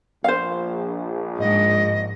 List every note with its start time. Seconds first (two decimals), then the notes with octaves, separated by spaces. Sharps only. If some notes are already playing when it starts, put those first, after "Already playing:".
0.24 A#1 C5 F5
1.40 G#2 D#5